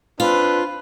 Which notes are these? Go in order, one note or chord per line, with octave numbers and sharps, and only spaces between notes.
C4 D4 F4 B4